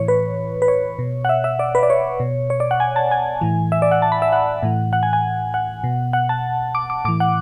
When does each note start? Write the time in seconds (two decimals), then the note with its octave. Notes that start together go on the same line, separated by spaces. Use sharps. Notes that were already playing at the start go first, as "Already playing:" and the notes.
Already playing: A2 E3 C#5
0.08 B4
0.62 B4
0.68 C#5
0.99 B2
1.25 F#5
1.29 E5
1.44 E5
1.59 D5
1.75 B4
1.83 D5
1.90 C#5
2.20 B2
2.50 C#5
2.60 D5
2.71 F#5
2.80 G#5
2.96 A5
3.11 G#5
3.41 A2 E3
3.72 E5
3.82 D5
3.91 F#5
4.02 A5
4.12 B5
4.22 E5
4.33 F#5
4.63 A2 E3
4.93 F#5
5.03 G#5
5.13 G#5
5.54 F#5
5.84 B2
6.13 F#5
6.29 A5
6.75 D6
6.90 D6
7.05 A2 E3 D6
7.20 F#5